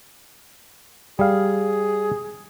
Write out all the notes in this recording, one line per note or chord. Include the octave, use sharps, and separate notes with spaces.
G3 G#4 F5